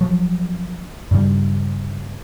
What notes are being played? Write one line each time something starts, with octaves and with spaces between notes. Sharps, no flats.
F3 F#3
G2 C#3 G3